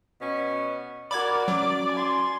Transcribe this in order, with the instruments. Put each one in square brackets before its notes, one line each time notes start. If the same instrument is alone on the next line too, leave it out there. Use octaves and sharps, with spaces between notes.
[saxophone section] B2 C#4
[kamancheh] F#4 A#4 [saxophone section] D5 [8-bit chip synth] B5 D6 G#6
[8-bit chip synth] F#3 [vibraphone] C#4 F#4 [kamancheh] D6
[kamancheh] G#5 C6